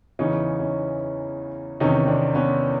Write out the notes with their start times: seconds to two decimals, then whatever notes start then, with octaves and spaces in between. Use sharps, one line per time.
0.19 E2 C#3 E3 C#4 D#4
0.59 C#4 D#4
1.80 E2 C3 D#3 C#4 D#4
2.07 C4 D4
2.35 B3 C#4